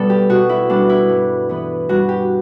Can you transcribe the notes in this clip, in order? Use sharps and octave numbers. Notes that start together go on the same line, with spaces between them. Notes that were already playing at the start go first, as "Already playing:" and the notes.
Already playing: B2 G3 B3 A4 D5
G4
B2 F#4
E4
G3 B3 D4
E4
G2
E3 B3
G2 F#4
G4